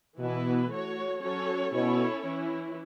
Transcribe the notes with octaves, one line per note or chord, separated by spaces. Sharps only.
B2 E3 B3 E4 B4
A3 F#4 C#5
F#3 C#4 A4 C#5
B2 C#4 E4 A4 C#5
E3 C#4 E4